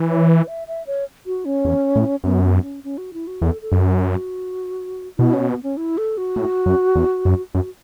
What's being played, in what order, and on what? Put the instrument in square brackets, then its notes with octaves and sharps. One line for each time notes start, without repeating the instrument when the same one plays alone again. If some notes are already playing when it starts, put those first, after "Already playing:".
Already playing: [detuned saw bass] E3
[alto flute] C#5
B4
E5
E5
C#5
F#4
C#4
[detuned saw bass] E2
A2
[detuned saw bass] F#2 [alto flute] B3
[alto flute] B3
C#4
C#4
F#4
E4
F#4
[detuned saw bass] E2 [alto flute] A4
[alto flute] A4
[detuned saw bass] F#2
[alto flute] F#4
[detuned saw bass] B2 [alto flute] E4
[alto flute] C#4
B3
C#4
E4
A4
F#4
[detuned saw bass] A2
F#2
E2
F#2
[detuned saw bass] F#2 [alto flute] F#4